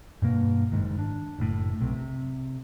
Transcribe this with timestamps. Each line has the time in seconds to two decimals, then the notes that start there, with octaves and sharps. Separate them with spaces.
0.22 G2 B2 A#3
0.72 F#1 G#2 D#3
0.99 D4
1.38 F#1 A2
1.81 B1 C3
1.94 C3